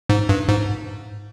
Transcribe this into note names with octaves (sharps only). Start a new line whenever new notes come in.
G#2
G2
G#2